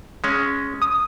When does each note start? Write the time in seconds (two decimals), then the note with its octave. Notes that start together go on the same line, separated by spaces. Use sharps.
0.24 G#3 C#4
0.82 D#6